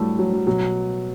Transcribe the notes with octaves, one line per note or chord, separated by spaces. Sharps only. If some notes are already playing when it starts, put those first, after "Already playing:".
Already playing: A2 E3 F#3 G3 A3
F#3
F#3
B2 F#3